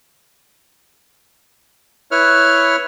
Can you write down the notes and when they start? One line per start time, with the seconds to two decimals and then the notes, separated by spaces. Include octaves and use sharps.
2.11 E4 B4 C#5 F6